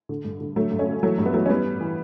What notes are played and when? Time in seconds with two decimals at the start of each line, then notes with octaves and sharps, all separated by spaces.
0.09 D3
0.25 G2
0.41 D3
0.56 D3 F#3 A3
0.72 G2
0.79 A3 C#4
0.88 D3
1.03 E3 F#3 A3
1.18 G2 G3
1.26 B3
1.34 E3 F#3 A3
1.46 C#4
1.50 E3 G3 B3
1.65 A2
1.81 E3